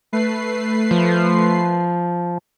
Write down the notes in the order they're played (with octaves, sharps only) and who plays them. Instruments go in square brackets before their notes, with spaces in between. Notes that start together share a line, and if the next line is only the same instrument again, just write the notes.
[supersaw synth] A3 B4 C7
[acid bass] F3